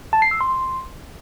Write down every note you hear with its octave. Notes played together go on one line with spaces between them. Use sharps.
A5
C7
E6
C6